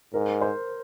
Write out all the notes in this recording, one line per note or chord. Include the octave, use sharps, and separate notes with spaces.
G#2 A#4
C5